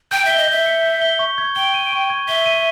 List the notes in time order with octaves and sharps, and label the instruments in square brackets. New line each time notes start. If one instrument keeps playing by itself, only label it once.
[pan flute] G5 [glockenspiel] G6
[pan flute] E5 [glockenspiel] G7
[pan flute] D#5
[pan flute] E5 [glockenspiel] G6
[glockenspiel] C#7
G6
G7
C#6
G#6
[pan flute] G5 [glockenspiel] G7
[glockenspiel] D#7
C#6
G#6
[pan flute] E5 [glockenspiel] G7
[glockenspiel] D#7